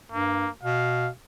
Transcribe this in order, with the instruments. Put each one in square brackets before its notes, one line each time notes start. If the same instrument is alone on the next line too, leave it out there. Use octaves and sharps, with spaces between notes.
[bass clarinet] G2 [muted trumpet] A#3
[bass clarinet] B2 [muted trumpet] F5